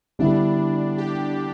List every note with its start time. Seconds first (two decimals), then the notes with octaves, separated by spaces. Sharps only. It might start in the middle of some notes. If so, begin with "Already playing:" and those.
0.19 D3 G3 B3 D4 E4
0.98 G4